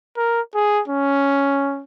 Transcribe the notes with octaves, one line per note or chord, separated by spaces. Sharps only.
A#4
G#4
C#4